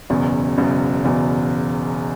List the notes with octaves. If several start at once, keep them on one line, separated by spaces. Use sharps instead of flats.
F#1 E2 B2
F#1 E2 B2
F#1 E2 B2